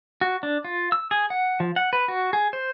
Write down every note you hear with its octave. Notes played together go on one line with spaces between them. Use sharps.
F#4
D4
F4
E6
G#4
F#5
F3
F#5
B4
F#4
G#4
C5